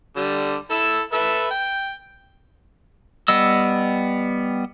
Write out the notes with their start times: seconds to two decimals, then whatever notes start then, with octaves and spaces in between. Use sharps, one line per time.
0.16 D3 G3
0.70 E4 A4
1.13 A4 B4 E5
1.51 G5
3.28 G3 B3 D#5 E6